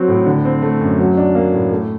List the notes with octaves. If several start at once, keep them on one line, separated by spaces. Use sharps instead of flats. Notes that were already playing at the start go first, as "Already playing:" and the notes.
Already playing: F#3 C4 F#4
A2
D3
C4
A3
F#2
F#3
D4
A#3
A2
A3